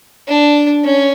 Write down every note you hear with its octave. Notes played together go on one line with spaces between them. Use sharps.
D4
C#4